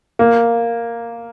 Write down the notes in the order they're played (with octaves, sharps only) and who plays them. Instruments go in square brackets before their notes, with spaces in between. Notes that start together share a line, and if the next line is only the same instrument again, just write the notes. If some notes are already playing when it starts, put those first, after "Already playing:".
[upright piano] A#3